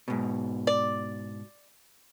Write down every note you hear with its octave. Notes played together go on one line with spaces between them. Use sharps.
G#2 B2
D5